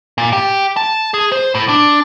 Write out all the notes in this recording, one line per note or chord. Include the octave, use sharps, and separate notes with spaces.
A#2
G4
A5
G#4
C5
A2
D4